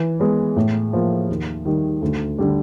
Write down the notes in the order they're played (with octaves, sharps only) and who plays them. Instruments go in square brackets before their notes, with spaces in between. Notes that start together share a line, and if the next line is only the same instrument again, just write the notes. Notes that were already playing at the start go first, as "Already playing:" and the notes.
Already playing: [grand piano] E3
G#3 B3
A2
F3 A#3
D#2
D#3 G3
D2
D3 G3